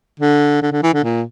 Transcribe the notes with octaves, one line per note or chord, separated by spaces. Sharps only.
D3
D3
D3
E3
D3
A#2